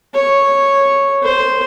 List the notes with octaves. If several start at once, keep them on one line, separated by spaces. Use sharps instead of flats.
C#5
C5